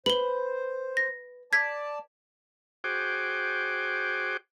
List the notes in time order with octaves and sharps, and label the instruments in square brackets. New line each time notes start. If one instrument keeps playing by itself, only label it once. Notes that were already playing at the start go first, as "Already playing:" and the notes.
[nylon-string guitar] B4 [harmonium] C5 [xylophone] F#7 G7
[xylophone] A#6
[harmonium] D5 A5 [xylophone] G#6 B6
[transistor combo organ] F#4 G#4 C5 G5 D6